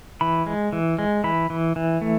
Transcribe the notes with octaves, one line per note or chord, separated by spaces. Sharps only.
E3 B5
G#3
E3
G#3
E3 B5
E3
E3
A3